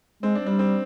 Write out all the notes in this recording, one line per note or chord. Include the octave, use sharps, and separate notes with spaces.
G#3 C4
D4
G3
D4
C4